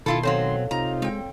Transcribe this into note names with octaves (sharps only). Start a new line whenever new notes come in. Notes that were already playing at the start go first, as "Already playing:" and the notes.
B2 D#3 E4 F4 A4 B5 C6
F#3 C4 A4 C5 C#5 F5
C3 D#4 F4 A#5
G#3 C4 G5